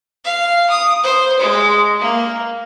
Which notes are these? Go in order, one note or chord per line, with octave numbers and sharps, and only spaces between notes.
F5
D#6
C5
G#3
A#3